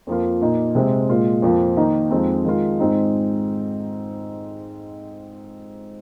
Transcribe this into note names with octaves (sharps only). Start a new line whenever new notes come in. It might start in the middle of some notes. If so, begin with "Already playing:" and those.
F2 F3 A#3 F4
A#2 A#3 D#4
C3 G#3 C4
A#2 G#3 F4
F2 F3 A#3 F4
D#3 A#3 D#4
F2 F3 G#3 C4 D#4
D#3 G#3 F4
G#2 G#3 C4 D#4